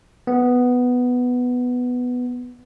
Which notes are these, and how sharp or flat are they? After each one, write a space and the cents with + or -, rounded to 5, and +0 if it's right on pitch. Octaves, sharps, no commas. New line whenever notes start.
B3 +5